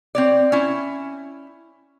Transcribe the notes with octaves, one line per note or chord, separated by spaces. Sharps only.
C4 C#5 D5
C#4 E4